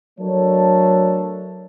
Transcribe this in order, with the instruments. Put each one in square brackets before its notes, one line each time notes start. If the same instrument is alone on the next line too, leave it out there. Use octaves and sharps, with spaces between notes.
[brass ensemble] F#3 A3 D4 A4 A#4 C#5